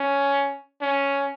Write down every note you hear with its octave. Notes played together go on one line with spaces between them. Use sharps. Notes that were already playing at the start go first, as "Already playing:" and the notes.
Already playing: C#4
C#4